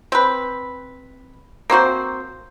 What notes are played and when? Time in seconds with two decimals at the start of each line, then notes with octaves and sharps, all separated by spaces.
0.12 C4 B4
1.70 A#3 C4 F#4 C5